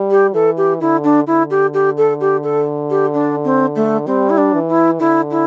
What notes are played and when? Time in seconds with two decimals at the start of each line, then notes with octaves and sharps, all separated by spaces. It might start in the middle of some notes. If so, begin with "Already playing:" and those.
Already playing: G3
0.11 G4
0.34 E3 A4
0.57 G4
0.81 D3 E4
1.04 D4
1.27 D3 E4
1.50 G4
1.74 G4
1.97 A4
2.20 G4
2.43 A4
2.90 G4
3.14 D4
3.44 C4
3.76 A3
4.07 G3 C4
4.30 E4
4.38 D4
4.54 E3
4.69 E4
4.99 D3 E4
5.31 E4